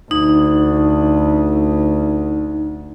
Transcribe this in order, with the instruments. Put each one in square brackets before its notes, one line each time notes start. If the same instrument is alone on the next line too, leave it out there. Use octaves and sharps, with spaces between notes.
[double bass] D2 [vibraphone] D#4